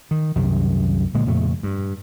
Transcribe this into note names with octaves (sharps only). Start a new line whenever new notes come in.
D#3
C2 F#2 C3 D#3
A#2 D3 G#3
F2 A#2 C#3 A3
G2